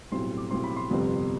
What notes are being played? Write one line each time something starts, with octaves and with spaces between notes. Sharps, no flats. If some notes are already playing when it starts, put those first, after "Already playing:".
B1 A2 G3 C4 C6
D6
B1 A2 G3 C4 C6
B5
C6
G1 F2 C3 G3 B3